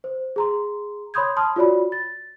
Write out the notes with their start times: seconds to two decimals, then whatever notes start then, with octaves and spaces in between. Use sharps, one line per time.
0.04 C5
0.36 G#4 A#5 C6
1.14 C#5 B5 C6 D#6 G6 G#6
1.37 A5 C6 D#6 F6
1.56 F4 F#4 C#5 D5 B5
1.92 A6